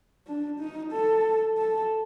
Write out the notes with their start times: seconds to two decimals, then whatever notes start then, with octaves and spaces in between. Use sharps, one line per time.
0.27 D4
0.59 D#4
0.92 A4
1.58 A4